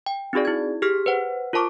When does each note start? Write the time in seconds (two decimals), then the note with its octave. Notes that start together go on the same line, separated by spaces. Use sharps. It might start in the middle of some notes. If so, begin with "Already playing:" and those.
0.06 G5
0.33 C4 D#4 F#4 G#4 D5
0.45 E4 G#6
0.82 G4 G#4 F6 B6
1.06 B4 C5 F#5
1.53 F4 A#4 C5 A5 C#6 D6